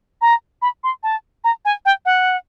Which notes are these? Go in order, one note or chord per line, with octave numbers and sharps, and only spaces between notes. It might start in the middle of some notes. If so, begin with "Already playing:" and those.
A#5
B5
C6
A5
A#5
G#5
G5
F#5